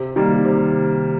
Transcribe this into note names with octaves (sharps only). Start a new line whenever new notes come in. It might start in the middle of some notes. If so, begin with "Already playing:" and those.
Already playing: C3
D#3 G3 A#3
C3